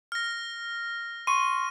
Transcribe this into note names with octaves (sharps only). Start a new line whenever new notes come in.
F6 A#6
C6 C#6 D#7